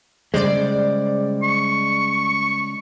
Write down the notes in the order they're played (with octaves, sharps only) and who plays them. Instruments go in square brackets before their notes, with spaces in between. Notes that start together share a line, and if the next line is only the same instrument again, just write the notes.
[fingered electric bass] C#3 G3 G#3 [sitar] C5 D5
[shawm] C#6